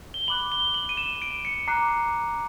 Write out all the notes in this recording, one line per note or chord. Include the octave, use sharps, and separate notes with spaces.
G7
B5 D6 F#6 F#7
G7
F#7
D#7
E7
D7
C#7
A#5 D6 F#6 C7